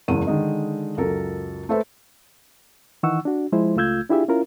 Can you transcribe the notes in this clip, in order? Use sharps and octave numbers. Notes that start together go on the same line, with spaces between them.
F#1 E2 G#3 D#7
D3 D#3 G#3 D#5
C#2 F#2 A4 A#4
A3 A4 B4 C5 E5
D#3 E3 D#4 F#5 C#6 E6
D4 F#4
F3 G#3 E4 C5
C#2 A3 F4 E6 G6 G#6
D4 E4 F4 G4 G#4 E5
C#4 E4 F4 A#4